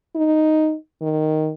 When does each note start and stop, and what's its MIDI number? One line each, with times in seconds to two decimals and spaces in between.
0.15 0.75 63
1.02 1.51 51